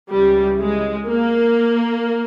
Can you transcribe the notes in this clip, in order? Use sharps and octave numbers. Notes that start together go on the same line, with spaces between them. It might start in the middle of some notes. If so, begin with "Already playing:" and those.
C#2 C#3 E3 G3
G#3
A#3